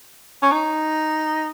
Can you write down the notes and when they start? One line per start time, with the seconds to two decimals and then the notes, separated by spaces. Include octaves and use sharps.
0.42 C#4
0.51 D#4